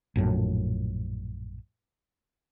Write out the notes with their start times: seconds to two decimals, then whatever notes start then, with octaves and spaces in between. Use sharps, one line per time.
0.16 A#1 F#2 A2